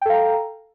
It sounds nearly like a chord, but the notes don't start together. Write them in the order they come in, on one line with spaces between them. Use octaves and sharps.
G5 A4 F5 A#5